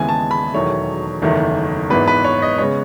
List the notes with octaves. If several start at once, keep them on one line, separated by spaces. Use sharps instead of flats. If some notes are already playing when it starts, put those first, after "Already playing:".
Already playing: D#2 C#3 E3 G#3 B3 G#5
A5
B5
E1 E2 D#3 F#3 A3 C#5
F#1 E2 D#3 A3
G#1 G#2 E3 B3 B4
B4
C#5
D#5
C#3 G#3 B3 C#5